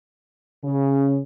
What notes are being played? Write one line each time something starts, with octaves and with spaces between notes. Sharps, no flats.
C#3